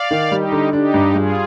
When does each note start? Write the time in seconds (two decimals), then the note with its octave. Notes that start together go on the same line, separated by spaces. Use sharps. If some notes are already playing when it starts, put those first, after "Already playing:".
Already playing: D5 F5
0.11 D#3
0.31 G3 D#4 G4
0.52 D3
0.73 D4 D#4 G4
0.94 G2
1.14 G3 F4 G#4